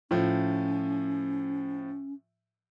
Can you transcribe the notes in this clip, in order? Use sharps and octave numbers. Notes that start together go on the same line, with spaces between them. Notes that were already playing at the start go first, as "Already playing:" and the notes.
A2 F3 C#4